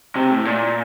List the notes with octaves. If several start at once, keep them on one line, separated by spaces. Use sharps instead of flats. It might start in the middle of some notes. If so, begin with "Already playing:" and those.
C3
A2
A#2